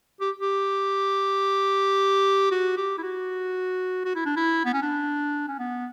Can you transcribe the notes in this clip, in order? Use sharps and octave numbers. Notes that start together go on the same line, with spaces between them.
G4
G4
F#4
G4
E4
F#4
F#4
E4
D4
E4
B3
C#4
D4
C#4
B3